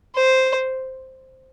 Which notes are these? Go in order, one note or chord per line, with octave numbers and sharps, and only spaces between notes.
C5